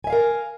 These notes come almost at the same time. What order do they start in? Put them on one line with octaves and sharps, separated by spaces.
G#5 E5 F5 A#4